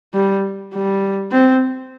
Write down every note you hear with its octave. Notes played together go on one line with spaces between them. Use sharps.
G3
G3
C4